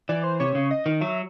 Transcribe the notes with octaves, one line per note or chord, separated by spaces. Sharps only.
E3 D5
C5
C3 C#5
C#3
D#5
D#3
F#3 E5